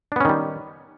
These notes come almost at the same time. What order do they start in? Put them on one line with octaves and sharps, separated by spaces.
D4 B3 C#4 D#3 G3